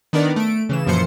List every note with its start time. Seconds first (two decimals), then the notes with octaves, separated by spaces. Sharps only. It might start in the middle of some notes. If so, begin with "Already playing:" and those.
0.13 D#3 B3 D4 A#4 D5
0.36 A3 D7
0.69 C#3 E3 E7
0.86 F#2 A#2 E3 F3 C5 C#7